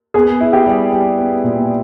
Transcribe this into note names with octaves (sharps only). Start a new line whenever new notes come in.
B3 G#4
E4
G4
G3
G3
B3
A#2